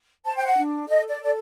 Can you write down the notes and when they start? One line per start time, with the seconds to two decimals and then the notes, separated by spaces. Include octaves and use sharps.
0.24 C5 A5
0.36 G5
0.45 F#5
0.56 D4
0.87 A4 D#5
1.08 D5
1.19 A4 D5